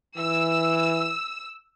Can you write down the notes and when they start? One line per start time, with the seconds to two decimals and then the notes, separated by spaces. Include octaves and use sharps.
0.18 E3 E6